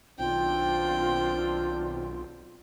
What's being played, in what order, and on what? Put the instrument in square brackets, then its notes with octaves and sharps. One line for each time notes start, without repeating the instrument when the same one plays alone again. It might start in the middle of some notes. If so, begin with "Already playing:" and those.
[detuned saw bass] B1 [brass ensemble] D#3 C4 D4 [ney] F4 [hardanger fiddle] G5